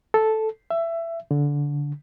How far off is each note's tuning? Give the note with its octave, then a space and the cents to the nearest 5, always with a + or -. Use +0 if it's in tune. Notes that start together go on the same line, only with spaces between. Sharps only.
A4 -5
E5 +20
D3 -20